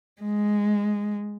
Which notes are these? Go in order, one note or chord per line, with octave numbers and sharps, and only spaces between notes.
G#3